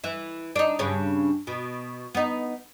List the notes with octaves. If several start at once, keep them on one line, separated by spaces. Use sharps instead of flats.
E3 E4
D4 D#4
G2 C#3 C#4
B2
B3 D#4